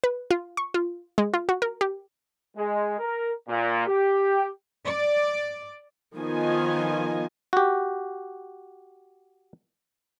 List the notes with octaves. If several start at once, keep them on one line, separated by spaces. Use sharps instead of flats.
B4
F4
C#6
F4
G#3
F4
F#4
A#4
G4
G#3
A#4
A#2
G4
D5
D#3 F3 B3 F4 D#5 G#5
F#4 G4